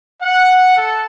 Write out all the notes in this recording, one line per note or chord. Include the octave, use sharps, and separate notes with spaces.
F#5
A4